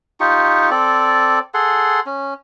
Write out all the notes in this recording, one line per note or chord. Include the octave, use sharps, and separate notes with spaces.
D#4 F4 G4 C#6
C4 A4 D5
G#4 A4 F#5 C6
C#4